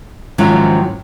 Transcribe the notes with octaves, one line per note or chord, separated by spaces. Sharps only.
G#2 D#3 F3 F#3 C#4 E4